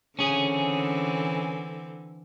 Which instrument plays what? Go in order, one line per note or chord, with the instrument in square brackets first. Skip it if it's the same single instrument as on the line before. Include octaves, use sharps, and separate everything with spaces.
[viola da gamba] D3 E3 C4 [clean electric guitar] C#4 G#4